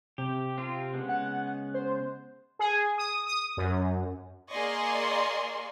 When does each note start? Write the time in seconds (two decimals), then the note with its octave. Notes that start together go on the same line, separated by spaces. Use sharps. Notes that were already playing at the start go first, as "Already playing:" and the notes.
0.18 C3 G4
0.58 C4 F4
0.94 C#3 G#3 B3
1.09 F#5
1.74 C5
2.59 G#4
2.98 D#6
3.27 D#6
3.57 F#2
4.51 A#3 G#4 D5 D#5 C6 C#6